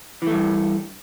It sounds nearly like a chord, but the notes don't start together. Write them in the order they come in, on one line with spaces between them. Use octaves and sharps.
E3 A3 G2